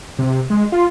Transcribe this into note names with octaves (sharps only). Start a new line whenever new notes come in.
C3
G#3
F4